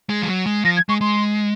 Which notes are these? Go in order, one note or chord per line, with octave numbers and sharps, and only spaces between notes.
G#3
F3
F#3
G#3
F3 A#6
G#6
G#3 C#6
G#3 C6